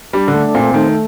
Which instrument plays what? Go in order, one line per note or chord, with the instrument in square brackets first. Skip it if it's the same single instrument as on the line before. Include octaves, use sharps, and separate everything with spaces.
[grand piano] G3 [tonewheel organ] D4
[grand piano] D3
[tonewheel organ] A3
[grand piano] A#2 [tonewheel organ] C4
[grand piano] D#3 [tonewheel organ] A3